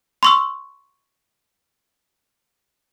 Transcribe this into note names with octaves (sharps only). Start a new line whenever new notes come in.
C6 C#6 E6